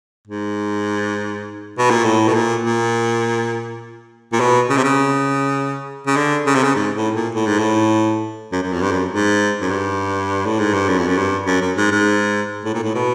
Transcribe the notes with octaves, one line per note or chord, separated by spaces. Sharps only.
G#2
B2
A#2
A2
B2
A#2
A#2
A#2
B2
C#3
C3
C#3
C#3
D3
C#3
C3
C#3
G#2
A2
A#2
A2
G#2
A2
F#2
F#2
F2
G2
F#2
G#2
F#2
G2
A2
G#2
G2
F#2
F2
F#2
G2
F#2
F#2
G#2
G#2
A2
A#2
A2
B2